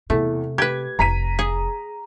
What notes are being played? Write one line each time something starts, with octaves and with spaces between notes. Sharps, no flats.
E2 C3 A3
G4 B4 G#6
F1 A#5 B6 D#7
G#4